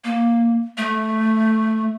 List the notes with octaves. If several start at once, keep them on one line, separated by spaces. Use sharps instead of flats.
A#3
A3